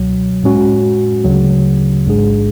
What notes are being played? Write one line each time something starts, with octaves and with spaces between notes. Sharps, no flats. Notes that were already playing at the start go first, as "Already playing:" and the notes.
Already playing: C#2 B2 F#3
A2 G#3 C#4 F#4
D2 C#3 F#3
A1 G#2 G#3 D4 G#4